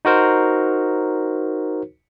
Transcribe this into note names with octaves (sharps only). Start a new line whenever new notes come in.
D#4 F#4 A#4 C5